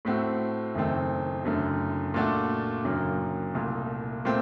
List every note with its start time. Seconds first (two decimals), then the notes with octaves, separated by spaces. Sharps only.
0.05 A2 A3 C4 F#4
0.75 F#1 F#2 D#3 A3 C4
1.45 F#1 F#2 D3 A3
2.14 A#2 A3 D4 F#4
2.84 F#1 F#2 D3 F#3 A#3
3.55 C2 A#2 A3
4.25 A#2 A3 C4